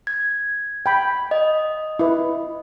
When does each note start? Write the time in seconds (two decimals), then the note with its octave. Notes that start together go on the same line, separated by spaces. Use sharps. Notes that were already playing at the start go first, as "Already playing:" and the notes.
0.07 G#6
0.86 G5 B5
1.31 D#5
1.99 E4 B4